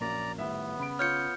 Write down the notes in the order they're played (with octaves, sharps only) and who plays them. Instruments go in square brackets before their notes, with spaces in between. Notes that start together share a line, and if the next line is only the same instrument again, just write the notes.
[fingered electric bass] A#1 [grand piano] F#2 A#3 [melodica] D5 A#5
[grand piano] D#1 E5 [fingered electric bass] A2 [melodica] B3
[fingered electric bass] C#3 [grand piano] B5 D7
[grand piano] F4 C#5 [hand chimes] F6 G6 C#7